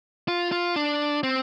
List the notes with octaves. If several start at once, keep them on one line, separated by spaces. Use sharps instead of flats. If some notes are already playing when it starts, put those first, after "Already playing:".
F4
F4
D4
C4